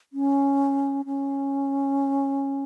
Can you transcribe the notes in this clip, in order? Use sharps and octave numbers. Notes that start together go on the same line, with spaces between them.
C#4
C#4